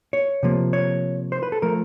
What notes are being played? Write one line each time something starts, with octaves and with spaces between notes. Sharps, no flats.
C#5
C3 F3 A#3
C#5
C5
B4
A4
F3 A3 A#4